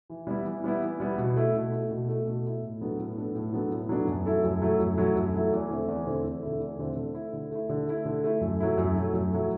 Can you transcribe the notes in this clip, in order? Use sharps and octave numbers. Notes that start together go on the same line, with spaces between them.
E3
G3 B3 E4
E3
G3 B3 E4
E3
G3 B3 E4
B2
A3 E4
B2
A3 E4
B2
A3 E4
B2
A3 E4
A2
F#3 B3 D4 A4
A2
F#3 B3 D4 A4
A2
F#3 B3 D4 A4
A2
F#3 B3 D4 A4
F#2
F#3 A3 E4 A4
F#2
F#3 A3 E4 A4
F#2
F#3 A3 E4 A4
F#2
F#3 A3 E4 A4
E2
D3 A3 C4 E4
E2
D3 A3 C4 E4
E2
D3 A3 C4 E4
E2
D3 A3 C4 E4
D3
A3 E4
D3
A3 E4
D3
A3 E4
D3
A3 E4
F#2
F#3 A3 E4
F#2
F#3 A3 E4
F#2
F#3 A3 E4